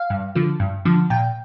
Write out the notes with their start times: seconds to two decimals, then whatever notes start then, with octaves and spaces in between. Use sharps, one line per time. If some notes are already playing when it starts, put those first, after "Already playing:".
Already playing: F5
0.10 G2
0.35 D3 F3
0.60 G2
0.85 D3 F3
1.10 A#2 G5